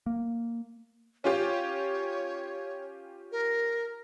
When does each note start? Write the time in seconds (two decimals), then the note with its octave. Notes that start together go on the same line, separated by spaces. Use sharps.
0.06 A#3
1.24 C#4 F4 G4 C#5
3.32 A#4